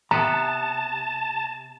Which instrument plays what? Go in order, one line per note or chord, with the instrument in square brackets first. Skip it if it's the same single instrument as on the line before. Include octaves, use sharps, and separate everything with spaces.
[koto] C3 B3 [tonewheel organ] A5 [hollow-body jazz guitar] A#5